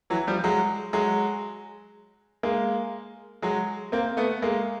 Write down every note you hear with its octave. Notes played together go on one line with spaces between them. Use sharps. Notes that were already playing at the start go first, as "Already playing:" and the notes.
E3 F#3
F3 G3
F#3 G#3
F#3 G#3
G#3 A#3
F#3 G#3
A#3 C4
A3 B3
G#3 A#3